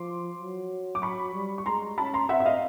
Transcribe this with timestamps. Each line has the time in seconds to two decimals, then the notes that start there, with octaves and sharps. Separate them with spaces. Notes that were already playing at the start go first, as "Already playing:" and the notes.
Already playing: F3 C6 D6
0.39 F#3
0.95 D6
1.02 F#3 B5 C#6
1.35 G3
1.58 C#6
1.66 G#3 A#5 C6
1.98 C#4 A5 B5
2.14 A#5 C6
2.29 C4 E5 F#5
2.40 E5
2.46 D#5 F5